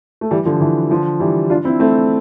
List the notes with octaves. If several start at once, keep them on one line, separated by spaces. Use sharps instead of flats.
A3
E3 G3
D3 F3
E3
D3 F3
E3 G3
D4 F4
C4 E4
A3 C4